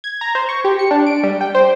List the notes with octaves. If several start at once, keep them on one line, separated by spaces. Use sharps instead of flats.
G#6
A#5
C5
C#6
G4
C#7
D4
D7
G3
G5
C5